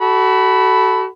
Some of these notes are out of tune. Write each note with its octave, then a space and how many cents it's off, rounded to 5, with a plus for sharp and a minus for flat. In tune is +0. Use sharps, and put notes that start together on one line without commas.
F#4 +30 A4 -5 B5 +0